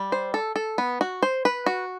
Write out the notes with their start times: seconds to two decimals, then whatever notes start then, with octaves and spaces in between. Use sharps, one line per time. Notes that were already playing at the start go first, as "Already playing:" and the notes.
Already playing: G3
0.12 C5
0.34 A4
0.56 A4
0.78 B3
1.01 F#4
1.23 C5
1.45 B4
1.66 F#4